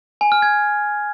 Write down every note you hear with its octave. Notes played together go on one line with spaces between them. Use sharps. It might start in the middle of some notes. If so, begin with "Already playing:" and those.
G#5
F6
G#6